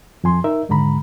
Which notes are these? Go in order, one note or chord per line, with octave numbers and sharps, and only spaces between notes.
F2 F3 G#5 C6
D#4 A#4 E5
D#2 G#2 D3 G#3 A#5 B5